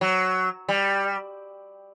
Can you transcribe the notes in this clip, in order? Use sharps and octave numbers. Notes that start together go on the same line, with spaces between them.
F#3
G3